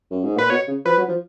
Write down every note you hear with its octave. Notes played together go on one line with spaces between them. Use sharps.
F#2
G#2
A#2 B4
B2 C#5
C#3
F3 B4
F#3
F3